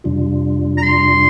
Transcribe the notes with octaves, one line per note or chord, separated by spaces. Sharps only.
F2 C3 G3 D4 F4
A#5
C6